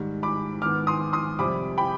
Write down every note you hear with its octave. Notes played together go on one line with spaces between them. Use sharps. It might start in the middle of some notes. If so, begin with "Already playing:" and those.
Already playing: G#2 D#3 G3
B5 D6
G#2 D#3 B3 D6 F6
C6 D#6
C6 D#6
F2 C3 G3 C4 B5 D6
G5 B5